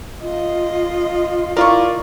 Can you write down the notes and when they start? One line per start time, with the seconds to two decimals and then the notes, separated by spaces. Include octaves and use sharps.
0.22 F4 D#5
1.57 E4 F4 A#4 D5 C#6